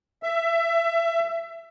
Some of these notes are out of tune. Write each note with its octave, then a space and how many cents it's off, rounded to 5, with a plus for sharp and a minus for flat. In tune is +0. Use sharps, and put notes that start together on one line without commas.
E5 +20